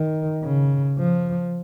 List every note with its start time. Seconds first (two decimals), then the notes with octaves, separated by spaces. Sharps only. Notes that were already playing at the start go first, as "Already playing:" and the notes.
Already playing: D#3
0.44 C#3
0.98 F3